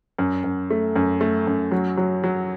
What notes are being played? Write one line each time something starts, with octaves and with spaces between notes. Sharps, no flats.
F#2
F#2
A3
F#2
A3
F#2
F#3
F#3
F#3